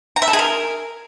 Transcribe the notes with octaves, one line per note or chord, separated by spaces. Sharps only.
A#5
E5
A4
G#4
A#4